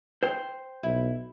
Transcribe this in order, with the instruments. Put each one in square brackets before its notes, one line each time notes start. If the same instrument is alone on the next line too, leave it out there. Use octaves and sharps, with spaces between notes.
[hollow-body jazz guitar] C5 G5
[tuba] B1 [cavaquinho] E4